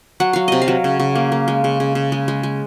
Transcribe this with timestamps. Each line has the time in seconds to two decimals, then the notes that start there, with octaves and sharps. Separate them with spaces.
0.20 F#3 F#5
0.33 F#3 F5
0.48 C3 D#5
0.62 F5
0.68 F#3
0.84 C#3
1.00 C#3
1.15 A#3
1.32 A#3
1.48 G#3
1.64 C#3
1.80 C#3
1.95 C#3
2.12 G#3
2.28 G#3
2.43 G#3